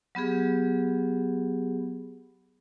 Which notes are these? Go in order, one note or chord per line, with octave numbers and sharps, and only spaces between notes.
F#3 B3 G4 G#4